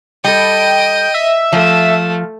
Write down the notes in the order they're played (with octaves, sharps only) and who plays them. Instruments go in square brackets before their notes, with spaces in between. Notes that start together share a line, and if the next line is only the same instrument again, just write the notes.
[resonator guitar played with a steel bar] G3 A4 [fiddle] D#5 [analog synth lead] G5
[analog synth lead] E5
[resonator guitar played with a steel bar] F3 [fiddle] A3